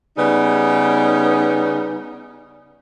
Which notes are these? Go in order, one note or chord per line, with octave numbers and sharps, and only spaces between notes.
C#3 G3 B3 D#4